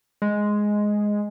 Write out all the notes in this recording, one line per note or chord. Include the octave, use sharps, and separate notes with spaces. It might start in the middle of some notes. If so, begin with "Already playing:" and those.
G#3